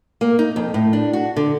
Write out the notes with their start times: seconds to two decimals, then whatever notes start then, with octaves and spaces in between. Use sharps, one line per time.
0.21 A#3
0.39 D#4
0.56 F2
0.74 A2
0.93 D4
1.13 F#4
1.36 D3